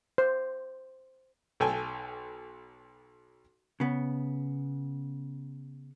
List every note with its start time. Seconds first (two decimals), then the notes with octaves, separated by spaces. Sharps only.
0.18 C5
1.60 B1 A4 G5 G#5
3.80 C#3 B3